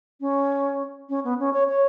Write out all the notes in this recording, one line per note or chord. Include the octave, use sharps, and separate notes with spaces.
C#4
C#4
B3
C#4
C#5
C#5